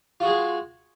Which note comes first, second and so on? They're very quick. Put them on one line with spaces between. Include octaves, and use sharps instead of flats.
F4 F#4 G#4 G#3